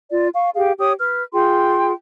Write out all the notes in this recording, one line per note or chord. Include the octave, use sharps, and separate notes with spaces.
F4 D5
F5 C#6
G4 G#4 F5
G4 C#5 D#6
B4 F6
F4 G#4 G5 C6